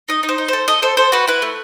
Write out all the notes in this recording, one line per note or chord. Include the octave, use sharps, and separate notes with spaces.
D#4 D#5
D#4
C5
D#4
A4 C5
A4 D#5
A4 C5
A4 C5
F#4 B4
E4 B4
A3